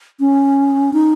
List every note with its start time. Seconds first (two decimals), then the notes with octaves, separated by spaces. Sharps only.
0.20 C#4
0.93 D#4